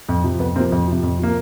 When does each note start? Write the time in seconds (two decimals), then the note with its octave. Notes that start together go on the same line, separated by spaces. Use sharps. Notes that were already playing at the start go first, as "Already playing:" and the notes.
0.09 F2
0.24 C3 F3
0.39 F2 B3
0.56 C3 F3 A#3 C4
0.72 F2
0.88 C3 F3
1.03 F2
1.19 C3 F3 A#3